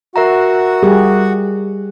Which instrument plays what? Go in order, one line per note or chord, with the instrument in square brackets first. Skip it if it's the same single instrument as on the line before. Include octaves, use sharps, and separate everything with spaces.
[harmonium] F#4 F#5 [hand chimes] A#4 E5 A#5
[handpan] G3 G4 G#4